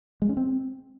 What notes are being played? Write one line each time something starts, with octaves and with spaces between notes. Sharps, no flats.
G#3
C#4
C4